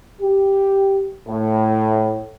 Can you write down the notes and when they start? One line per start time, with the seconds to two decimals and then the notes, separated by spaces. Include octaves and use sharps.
0.22 G4
1.28 A2